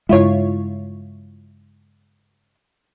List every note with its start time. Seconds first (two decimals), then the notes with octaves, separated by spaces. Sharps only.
0.09 G2 C#3 G#3 E4 F4 C#5